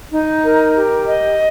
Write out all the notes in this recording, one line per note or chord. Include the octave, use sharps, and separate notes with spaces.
D#4
A#4
G4
D#5